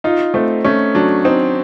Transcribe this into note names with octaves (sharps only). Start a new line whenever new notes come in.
D#4 F4
A3 C4
A3 C#4
F#3 D4
C4 D#4